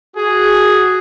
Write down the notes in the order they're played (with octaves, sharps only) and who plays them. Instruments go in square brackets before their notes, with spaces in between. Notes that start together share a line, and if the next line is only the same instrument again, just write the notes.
[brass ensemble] F#4 G#4